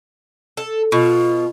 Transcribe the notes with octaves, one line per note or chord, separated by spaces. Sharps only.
A4
B2 F4